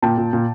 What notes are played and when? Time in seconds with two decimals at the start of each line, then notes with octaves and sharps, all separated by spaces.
0.02 A#2 G5 A5
0.18 A#2
0.33 A#2